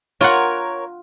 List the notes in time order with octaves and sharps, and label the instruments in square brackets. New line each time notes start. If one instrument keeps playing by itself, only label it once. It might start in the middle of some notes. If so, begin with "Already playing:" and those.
[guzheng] F4 F#5 [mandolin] A#4 C#5